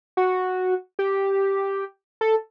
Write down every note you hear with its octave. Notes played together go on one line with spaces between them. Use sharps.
F#4
G4
A4